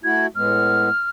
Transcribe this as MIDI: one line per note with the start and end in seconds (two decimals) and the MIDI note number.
0.04 0.27 57
0.04 0.27 64
0.04 0.27 66
0.04 0.26 92
0.35 0.90 45
0.35 0.90 56
0.35 0.90 59
0.35 1.10 89